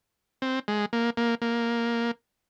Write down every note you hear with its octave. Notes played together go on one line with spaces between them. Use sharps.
C4
G#3
A#3
A#3
A#3